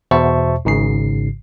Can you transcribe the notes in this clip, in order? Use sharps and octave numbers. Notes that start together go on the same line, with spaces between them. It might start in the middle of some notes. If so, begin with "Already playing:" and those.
E2 B2 C5 E5 A5 C#6
G#1 G#2 C#3 C7